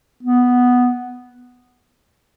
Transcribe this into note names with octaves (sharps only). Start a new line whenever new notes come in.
B3